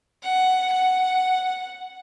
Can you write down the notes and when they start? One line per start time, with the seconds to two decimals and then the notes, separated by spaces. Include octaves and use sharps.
0.24 F#5
0.73 F#5